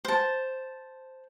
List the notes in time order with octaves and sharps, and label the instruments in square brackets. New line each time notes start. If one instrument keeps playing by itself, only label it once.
[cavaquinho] C5 A5